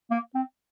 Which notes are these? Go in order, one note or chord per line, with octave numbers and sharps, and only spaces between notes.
A#3
C4